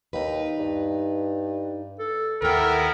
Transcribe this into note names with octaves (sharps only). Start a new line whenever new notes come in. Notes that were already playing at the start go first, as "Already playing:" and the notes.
D#2 D#4 B4
G2
A4
D#2 B3 E4 A4 A#4 G5